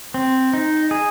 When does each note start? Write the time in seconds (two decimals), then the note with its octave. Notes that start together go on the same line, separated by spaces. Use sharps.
0.14 C4
0.54 D#4
0.91 G#4